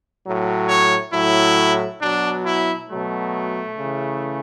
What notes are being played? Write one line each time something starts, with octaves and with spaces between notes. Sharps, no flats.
A2 F#3
C#5
A2 F#3 E4
B2 F#3 D4
E4
B2 F#3 A3
C#3 E3